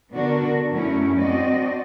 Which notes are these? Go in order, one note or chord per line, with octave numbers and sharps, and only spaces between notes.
D3 B3 D4 F#4 A#4
F#2 F#3 A3 C#4 E4
C4 D4 F#4 D5 D#5